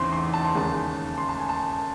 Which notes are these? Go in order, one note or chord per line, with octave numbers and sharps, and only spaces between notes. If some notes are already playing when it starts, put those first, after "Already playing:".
Already playing: E2 C#3 E3 C4 D#4 C6
C6
A5
C6
D#2 C#3 G#3 A5
C6
A5
G#5
A5